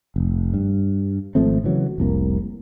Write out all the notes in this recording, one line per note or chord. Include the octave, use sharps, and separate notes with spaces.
F1
G2
G#1 F3 A3 C4
C#3 E3 F#3
F1 C2 A#3